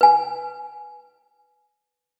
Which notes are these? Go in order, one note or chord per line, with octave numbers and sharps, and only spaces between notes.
B4 G#5